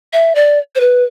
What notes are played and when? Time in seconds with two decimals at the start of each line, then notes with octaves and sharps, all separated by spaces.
0.13 E5
0.35 D5
0.75 C5
0.80 B4